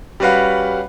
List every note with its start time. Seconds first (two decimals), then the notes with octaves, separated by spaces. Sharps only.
0.20 G3 C#4 F#4 B4 F5 F#5